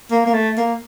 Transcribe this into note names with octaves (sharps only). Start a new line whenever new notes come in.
A#3
A#3
A3
A#3